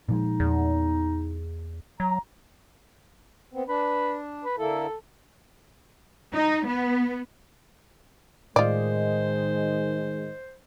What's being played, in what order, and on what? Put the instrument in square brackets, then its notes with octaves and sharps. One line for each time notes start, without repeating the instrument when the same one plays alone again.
[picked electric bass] A#2 F3 G#3 [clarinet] D#4
[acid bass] E2
[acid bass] F#3 [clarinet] A#5
[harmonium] B3 C4
[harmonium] D4 [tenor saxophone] B4
[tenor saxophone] B4
[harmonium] D3 A#3 E4 [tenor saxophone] A4
[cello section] D#4
B3
[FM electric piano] A2 D#5 [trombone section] D#3 G#3 [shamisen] F4 D5 [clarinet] C5